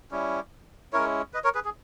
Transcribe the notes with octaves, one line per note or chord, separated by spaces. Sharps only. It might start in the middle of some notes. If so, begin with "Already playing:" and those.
G3 C#4 E4
G#3 C#4 E4 A#4 C#5
B4 D#5
A#4 C#5
G#4 B4
G#4